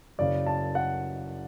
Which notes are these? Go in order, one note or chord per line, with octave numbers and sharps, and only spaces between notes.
F#1 F#2 C#3 D5
A5
F#5